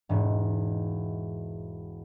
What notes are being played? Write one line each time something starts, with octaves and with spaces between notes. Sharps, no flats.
E1 G#2